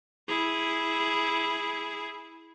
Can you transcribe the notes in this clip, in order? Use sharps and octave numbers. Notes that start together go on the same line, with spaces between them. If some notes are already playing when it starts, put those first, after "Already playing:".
E4 G#4